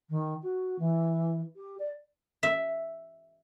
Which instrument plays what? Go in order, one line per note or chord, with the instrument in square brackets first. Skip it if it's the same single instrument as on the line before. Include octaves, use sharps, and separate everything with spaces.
[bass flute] D#3
F#4
E3
G4
D5
[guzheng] E5